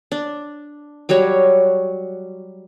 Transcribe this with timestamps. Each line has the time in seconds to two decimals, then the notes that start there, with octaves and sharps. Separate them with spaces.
0.12 D4
1.09 F#3 G3 F#4 C#5